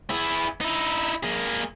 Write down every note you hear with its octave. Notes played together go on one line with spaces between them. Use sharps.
E4 G#4
D#4 E4
A#3 G#4